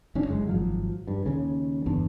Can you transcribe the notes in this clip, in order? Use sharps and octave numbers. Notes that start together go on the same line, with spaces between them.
D#1 C#4 D4
F#1 G#3
G#1 F3 F#3
G2
D#2 C#3
G1 E2 D4